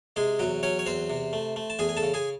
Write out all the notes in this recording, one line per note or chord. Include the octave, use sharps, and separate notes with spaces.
C3 G#3 G#4
E2 F#3 F#4
F#3 C#4 C#5
C#5
E2 C4 C5
C3
A3
A3
A5
E2 G#4 G#5
G#5
A4 A5
C#3
G#4 G#5